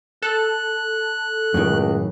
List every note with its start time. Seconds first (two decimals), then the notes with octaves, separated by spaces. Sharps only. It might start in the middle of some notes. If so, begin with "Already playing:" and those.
0.22 A4 F#6
1.54 C#2 F#2 A2 D#3